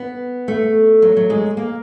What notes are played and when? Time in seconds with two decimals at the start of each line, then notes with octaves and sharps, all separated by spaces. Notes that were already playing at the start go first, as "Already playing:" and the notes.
Already playing: B3
0.48 A3
1.02 F#3
1.17 F#3
1.30 G#3
1.57 A#3